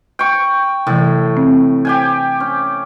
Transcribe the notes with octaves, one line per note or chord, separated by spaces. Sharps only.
G5 C#6
A2 C3 E3
C4
G4 G5 G#5
C#4